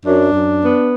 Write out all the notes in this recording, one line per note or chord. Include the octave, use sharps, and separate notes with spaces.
F#2 D4
F#2
B3